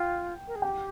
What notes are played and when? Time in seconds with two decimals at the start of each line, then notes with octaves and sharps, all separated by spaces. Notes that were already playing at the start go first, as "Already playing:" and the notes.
Already playing: F4 G5
0.47 A#4
0.55 G#4
0.62 G4 G5